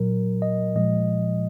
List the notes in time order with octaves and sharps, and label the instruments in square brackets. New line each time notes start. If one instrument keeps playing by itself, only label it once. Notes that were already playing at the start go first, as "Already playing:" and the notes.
Already playing: [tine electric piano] A#2 F#3 A#4
D#5
A#2 F3 G#3 D#5